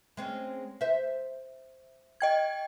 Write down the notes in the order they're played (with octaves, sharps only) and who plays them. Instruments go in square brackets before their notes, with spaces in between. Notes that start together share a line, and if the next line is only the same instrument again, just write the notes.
[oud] G#3 C4 C#4
C5 E5
[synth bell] D#5 G5 G#6